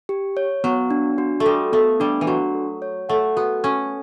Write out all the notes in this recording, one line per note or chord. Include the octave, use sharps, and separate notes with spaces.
G4
C#5
F#3 B3
D4
F#4
A3
G3 A4
A3 B3
G3 D4
E3
F#3 F#4
A4
C#5
A3 F#5
B3 F#4
C#4 A4